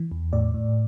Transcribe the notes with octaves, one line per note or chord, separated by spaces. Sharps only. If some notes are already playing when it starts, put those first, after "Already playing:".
Already playing: E3
E2
A2 D5
A2